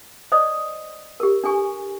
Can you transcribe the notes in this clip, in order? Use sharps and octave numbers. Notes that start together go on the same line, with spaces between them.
C5 D5 D#5 D#6
G4 A#4
D4 A4 G#5 C#6